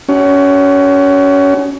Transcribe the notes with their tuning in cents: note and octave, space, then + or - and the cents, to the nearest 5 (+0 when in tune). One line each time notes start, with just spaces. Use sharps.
C#4 +25 F#4 +35